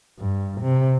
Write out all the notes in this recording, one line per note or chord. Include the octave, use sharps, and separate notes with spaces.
G2
C3